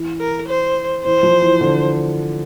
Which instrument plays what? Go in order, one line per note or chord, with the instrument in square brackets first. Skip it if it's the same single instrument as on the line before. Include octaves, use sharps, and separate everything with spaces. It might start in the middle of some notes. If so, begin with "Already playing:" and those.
Already playing: [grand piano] E3
[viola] A#4
C5
[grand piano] E3 [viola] C5
[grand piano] F3
E3
D3